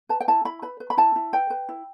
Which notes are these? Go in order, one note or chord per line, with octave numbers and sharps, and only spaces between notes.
B4 A5
G5
E4 A5
E4 B5
B4 B5
B4
B5
E4 A5
E4
B4 G5
B4
E4